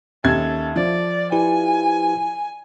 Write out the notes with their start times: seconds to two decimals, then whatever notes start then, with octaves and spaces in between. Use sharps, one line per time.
0.24 D#2 C#4 A4 E5 G#6
0.76 F3 D5
1.32 E4 G4 B4 G#5